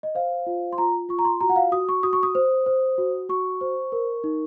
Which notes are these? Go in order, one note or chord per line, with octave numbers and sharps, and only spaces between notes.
D#5
C5 F5
F4
C6
F4 A#5
F4 C#6
A#5
C6
F#4 A#5
F#5
F5
F#4 D#6
C#6
F#4 D#6
C#6
D#6
C5
C5
F#4
F#4 C#6
C5
A#4
D#4